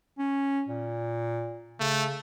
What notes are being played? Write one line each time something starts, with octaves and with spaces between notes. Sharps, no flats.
C#4
A#2
C#3 A3